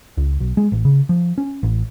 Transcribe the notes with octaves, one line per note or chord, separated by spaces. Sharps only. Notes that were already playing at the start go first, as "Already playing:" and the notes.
C#2
B1
G#3
A1
C#3
F3
C#4
A1